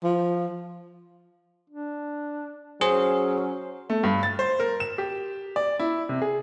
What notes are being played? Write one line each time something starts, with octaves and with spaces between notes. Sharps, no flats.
F3
D4
F#3 C#4 G#4 C5
A3
G2
A6
C5
A#4
E7
G4
D5
E4
C3
G#4